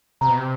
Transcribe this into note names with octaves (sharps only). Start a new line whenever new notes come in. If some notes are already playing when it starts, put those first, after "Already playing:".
C3 A#5
B2
C3